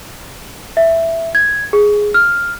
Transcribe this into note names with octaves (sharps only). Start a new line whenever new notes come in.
E5
G#6
G#4
F6